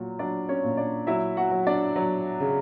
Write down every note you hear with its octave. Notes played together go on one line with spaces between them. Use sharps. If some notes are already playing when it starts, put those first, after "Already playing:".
Already playing: A#2 F#3
F#3 D4 D5
C#4 C#5
A#2
D4 D5
F#3 E4 E5
F#4 F#5
F#3
D4 D5
F#3
C#3